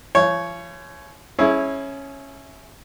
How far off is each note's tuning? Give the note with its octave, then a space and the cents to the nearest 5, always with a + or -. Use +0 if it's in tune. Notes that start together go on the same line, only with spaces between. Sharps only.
F3 -40 C#5 +0
C#4 -10 E4 -5 G#4 +25